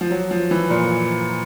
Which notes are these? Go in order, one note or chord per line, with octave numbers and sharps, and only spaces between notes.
F3
F#3
F3
E3
A#2